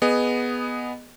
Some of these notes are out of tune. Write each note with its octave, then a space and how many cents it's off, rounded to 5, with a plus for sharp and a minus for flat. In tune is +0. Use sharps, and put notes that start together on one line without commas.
B3 +0 G#4 +0 D#5 -15